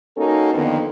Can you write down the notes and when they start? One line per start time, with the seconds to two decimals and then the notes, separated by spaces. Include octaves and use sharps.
0.17 A#3 C#4 D#4 F#4 A4
0.54 F2 D3 D#3 A#3 B3